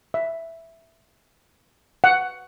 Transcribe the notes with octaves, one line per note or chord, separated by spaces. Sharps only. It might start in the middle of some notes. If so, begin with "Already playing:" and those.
E5
F#5